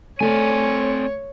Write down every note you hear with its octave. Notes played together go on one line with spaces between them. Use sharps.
A3 C4 C#5 D5 G#5